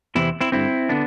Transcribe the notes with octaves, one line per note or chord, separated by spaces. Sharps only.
E2 C3 E3 C4 E4
C4 E4
G2 D3 C4 E4
D3 B3 D4